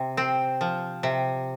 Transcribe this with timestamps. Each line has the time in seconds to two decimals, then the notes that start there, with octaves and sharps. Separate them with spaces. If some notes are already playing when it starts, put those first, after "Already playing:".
Already playing: C3
0.17 C4
0.61 F3
1.03 C3